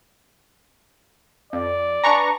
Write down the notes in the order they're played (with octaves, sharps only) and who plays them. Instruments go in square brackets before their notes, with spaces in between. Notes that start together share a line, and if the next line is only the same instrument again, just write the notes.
[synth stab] F2 [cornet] D5
[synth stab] D4 B4 G#5 [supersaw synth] A#5 C#6